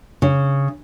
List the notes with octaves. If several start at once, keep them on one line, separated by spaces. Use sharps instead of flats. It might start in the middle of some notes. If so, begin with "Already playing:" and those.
C#3